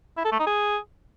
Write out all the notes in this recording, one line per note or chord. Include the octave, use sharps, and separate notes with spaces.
E4
A4
A3
D#4
G#4